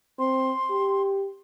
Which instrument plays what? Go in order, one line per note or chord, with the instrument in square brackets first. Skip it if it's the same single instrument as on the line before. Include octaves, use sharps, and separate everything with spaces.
[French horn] C4 [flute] C6
[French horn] G4